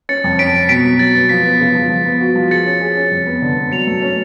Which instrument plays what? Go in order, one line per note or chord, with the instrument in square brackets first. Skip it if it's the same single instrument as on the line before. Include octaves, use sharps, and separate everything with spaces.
[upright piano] C#4 [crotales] A6 C#7
[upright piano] F2
[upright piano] C#4 [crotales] B6 D7
[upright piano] F2
[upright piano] B2 [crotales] B6 D7
[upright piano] F#3
[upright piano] F#3 [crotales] A6
[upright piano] B3
[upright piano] F3 [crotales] B6
[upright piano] B3
C#3
F3
F3
B3
F#4
F3
[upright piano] G#4 [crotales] A6 C#7
[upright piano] C#4
G#4
C#4
F2
B3
D3
B3
[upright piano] F#3 [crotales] C#7 F7
[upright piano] A3
C#4